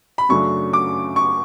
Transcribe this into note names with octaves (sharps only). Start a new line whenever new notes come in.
B5
F#2 C#3 F#3 A3 D4 C#6
D6
C#6